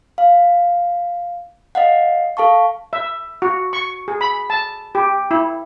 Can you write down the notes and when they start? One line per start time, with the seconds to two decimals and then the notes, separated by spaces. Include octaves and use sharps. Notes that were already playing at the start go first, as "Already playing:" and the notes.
0.18 F5
1.75 D#5 F5 F#5
2.37 A4 F5 A5 C#6
2.93 E5
3.42 F#4
3.73 C#6
4.08 G#4
4.21 B5
4.50 A5
4.95 G4
5.31 E4